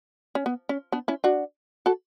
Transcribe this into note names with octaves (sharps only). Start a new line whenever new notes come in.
C#4
B3
C#4
B3 D4
C#4 E4
D4 F#4
F#4 A4